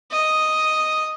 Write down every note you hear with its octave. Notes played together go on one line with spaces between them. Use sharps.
D#5